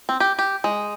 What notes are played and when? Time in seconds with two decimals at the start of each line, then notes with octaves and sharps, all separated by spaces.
0.09 C4
0.20 G4
0.39 G4
0.64 G#3